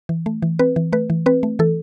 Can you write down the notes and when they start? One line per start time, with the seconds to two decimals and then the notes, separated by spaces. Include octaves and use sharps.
0.09 E3
0.26 A3
0.42 E3
0.59 C4 B4
0.76 E3
0.93 A3 B4
1.10 E3
1.26 C4 B4
1.43 A3
1.59 E3 A4